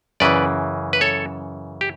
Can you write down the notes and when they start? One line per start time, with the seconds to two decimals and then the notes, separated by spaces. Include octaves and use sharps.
0.20 F#2 C#3 E3 B4 D5
0.93 B4
1.01 A4 C#5
1.81 G4